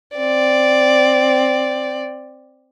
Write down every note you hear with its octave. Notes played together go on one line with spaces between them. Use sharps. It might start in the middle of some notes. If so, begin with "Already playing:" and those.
C4 D5